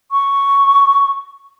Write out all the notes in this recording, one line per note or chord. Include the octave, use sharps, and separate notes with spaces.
C#6